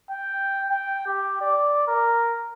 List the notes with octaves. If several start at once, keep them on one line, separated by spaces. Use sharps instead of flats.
G5
G5
G4
D5
A#4